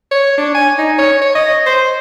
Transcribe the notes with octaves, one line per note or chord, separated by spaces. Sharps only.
C#5
D4
G#5
D#4
C#5
C#5
D#5
C5